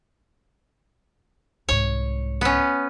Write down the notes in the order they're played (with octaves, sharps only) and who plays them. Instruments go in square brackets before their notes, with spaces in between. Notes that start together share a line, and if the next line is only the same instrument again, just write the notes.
[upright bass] C2 G#2 [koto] C#5
[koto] B3 C#4